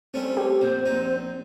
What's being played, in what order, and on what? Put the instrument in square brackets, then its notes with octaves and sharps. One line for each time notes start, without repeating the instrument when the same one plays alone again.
[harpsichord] G3 A3 C#4 [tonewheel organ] C4
[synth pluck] G4
[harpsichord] A#1 [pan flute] C5
[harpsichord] A#1 D#4